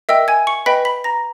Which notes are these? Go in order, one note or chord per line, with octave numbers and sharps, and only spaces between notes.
A#4 D#5 E5 G5 E6
G#5 G#6
C#6 C#7
B4 D#5 G5 B5 B6
B5 B6
A#5 A#6